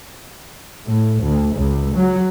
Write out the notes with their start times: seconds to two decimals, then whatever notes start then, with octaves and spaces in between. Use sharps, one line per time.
0.87 A2
1.23 D2
1.55 C#2
1.96 F#3